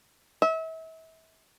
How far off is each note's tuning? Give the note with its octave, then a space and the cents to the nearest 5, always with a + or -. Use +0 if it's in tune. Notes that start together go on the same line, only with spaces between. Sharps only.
E5 -35